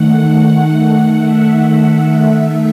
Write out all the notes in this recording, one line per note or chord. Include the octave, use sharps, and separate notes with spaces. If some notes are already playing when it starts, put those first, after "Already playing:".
Already playing: D#3 A3 F#5
F#5
E5
E5
D#3 A3